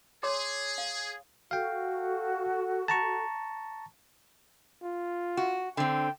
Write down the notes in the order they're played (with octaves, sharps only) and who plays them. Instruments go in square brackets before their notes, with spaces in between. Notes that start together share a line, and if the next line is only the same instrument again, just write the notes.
[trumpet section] G#4 [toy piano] C#5 C6 D6
[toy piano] F5
[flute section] F#4 A4 [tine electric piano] F5 G5
[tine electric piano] A5 A#5 C#6
[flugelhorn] F4
[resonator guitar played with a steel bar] F#4
[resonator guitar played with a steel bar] D3 C4 [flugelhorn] G5